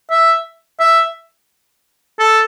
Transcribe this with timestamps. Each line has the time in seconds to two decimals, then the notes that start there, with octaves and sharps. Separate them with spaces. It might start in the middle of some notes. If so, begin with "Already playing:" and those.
0.11 E5
0.80 E5
2.19 A4